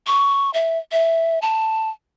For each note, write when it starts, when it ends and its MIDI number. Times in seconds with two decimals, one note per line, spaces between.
0.07 0.50 85
0.54 0.78 76
0.92 1.39 76
1.42 1.90 81